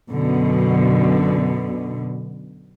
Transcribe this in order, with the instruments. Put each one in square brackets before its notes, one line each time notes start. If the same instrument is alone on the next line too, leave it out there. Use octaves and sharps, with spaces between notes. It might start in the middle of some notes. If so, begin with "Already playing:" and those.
[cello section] F#2 B2 D3